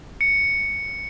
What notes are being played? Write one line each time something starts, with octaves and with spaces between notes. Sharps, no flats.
C#7